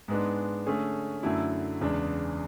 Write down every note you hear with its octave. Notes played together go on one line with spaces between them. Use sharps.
G#2 G#3 B3 D4
D3 A3 C#4 G#4
F#2 D3 F#3 A3 E4
E2 C#3 G#3 D4